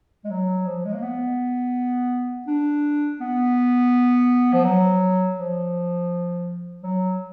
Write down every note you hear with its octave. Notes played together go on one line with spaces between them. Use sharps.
G#3
F#3
F3
G#3
A#3
B3
D4
B3
F3
F#3
F3
F#3